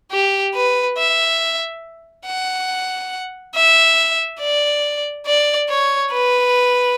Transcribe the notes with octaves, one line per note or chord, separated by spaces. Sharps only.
G4
B4
E5
F#5
E5
D5
D5
C#5
B4